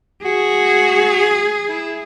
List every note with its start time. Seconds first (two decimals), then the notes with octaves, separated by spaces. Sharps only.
0.25 F#4 G#4
1.68 E4